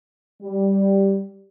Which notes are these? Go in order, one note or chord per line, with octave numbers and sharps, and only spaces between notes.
G3